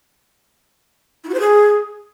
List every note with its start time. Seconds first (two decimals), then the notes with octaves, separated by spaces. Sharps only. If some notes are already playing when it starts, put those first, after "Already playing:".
1.24 E4
1.29 F#4
1.34 C5
1.39 G#4